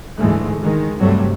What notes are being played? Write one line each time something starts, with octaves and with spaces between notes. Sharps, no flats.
D2 G#2 E3 G#3 A3
D#3 G#3
G2 C3 F#3 G3 A3